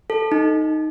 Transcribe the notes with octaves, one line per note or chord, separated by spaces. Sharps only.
A4
D#4